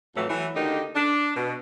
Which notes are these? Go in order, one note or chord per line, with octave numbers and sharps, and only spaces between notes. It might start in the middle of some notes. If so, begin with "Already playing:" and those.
F2 A2 E3 F#3
E3 F#3 A3
D2 D3 D#3 A#3 D#4 G4
D4
B2